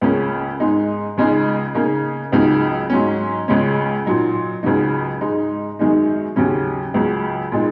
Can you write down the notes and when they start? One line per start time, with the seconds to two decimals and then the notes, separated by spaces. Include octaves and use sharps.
0.01 C#2 C#3 A#3 C#4
0.60 G#2 G#3 D#4
1.17 C#2 C#3 G#3 D#4
1.75 C#3 A#3 D#4
2.32 C#2 C#3 F#3 D#4
2.90 G#2 F#3 C#4
3.48 C#2 C#3 G#3 C#4
4.06 A#2 F#3 D#4
4.63 C#2 C#3 F#3 D#4
5.21 G#2 G#3 D#4
5.79 F#2 D#3 G#3 D#4
6.36 D#2 C#3 F#3 C#4
6.94 C#2 C#3 F#3 C#4
7.52 A#2 G#3 D#4